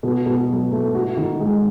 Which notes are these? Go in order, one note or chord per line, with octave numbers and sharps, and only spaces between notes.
B2
B2
F#3
A3
F#4
D#3
G#3